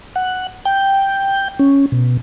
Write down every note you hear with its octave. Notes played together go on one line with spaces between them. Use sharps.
F#5
G5
C#4
B2